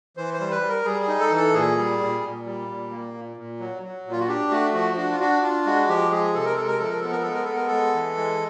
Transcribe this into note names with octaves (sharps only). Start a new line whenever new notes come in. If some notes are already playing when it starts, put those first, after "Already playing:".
E3 C5
C5
G3
B4
G3
A#4
G3 G#4
G#4
D#4
A4
E3
A4
A#2 G#4
G3
A#2
A#2
G3
A#2
A#3
A#2
A#2
F#3
F#3
A#2
F4
F#4
D4 G4
A3 F#4
F3 F#4
D4 F#4
F4
D4 F#4
D4 F4
G#3 F#4
F3 G4
G#3 G#4
C3 A4
A#4
G#3 A4
A#4
F3 A4
A#4
B3 A4
A#4
G#3 A4
A#4
B3 A4
A#4
G#3 A4
E3
G#3